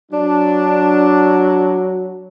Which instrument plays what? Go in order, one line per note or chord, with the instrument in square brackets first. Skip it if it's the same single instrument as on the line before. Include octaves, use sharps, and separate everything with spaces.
[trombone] F#3 [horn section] D4